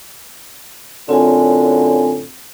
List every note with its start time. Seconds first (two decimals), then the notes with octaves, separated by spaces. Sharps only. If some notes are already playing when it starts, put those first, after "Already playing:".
1.09 F#2 A2 D3 C4 F4 G#5